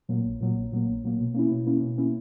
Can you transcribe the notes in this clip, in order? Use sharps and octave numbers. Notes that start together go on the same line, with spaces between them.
A#2 F#3 A#3
A#1
A#2 F#3 A#3
A#1
A#2 F#3 A#3
A#1
A#2 F#3 A#3
B2
A#3 C#4 E4
B2
A#3 C#4 E4
B2
A#3 C#4 E4